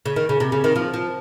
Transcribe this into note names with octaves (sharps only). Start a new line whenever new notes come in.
C#3
D#3
C#3
C3
C#3
D#3
F3
F3